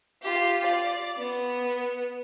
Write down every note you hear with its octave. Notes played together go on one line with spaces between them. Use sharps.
F4 G4
D5
B3